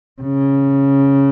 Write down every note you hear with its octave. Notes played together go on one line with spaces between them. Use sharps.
C#3